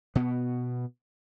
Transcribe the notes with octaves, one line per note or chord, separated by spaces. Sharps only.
B2 B3